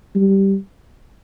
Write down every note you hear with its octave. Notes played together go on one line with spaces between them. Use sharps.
G3